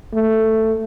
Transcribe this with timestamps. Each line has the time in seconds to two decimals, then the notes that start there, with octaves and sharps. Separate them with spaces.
0.14 A3